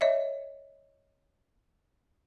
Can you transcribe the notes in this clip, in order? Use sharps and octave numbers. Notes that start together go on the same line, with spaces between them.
C#5 D#5 E5